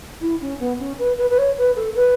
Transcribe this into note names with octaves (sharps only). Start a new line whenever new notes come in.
E4
C#4
B3
C#4
B4
B4
B4
C#5
B4
A4
B4